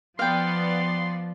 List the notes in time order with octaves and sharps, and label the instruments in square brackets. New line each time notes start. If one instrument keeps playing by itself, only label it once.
[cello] F3 [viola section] B3 D5 [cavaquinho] F5 G5 [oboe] C6